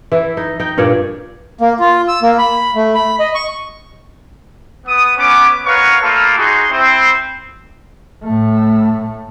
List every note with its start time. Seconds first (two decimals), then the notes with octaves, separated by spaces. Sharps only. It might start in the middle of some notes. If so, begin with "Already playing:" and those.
0.12 E3 E4
0.37 D#4
0.60 D#4 G5
0.78 G2 A#2 C#5 D5
1.61 A#3
1.80 F4
2.08 E6
2.22 A#3
2.39 B5
2.75 A3
2.94 B5
3.20 D#5
3.35 C#6
4.87 B3 D#6
5.17 B3 C#4 D6
5.66 B3 A#4 B4 C#5 F5 C#6
6.02 A3 A#3 F4 A4 A5 B5
6.38 D#4 F#4 G#4 D#5 C6
6.71 C4 E4 C5
8.24 A2 A3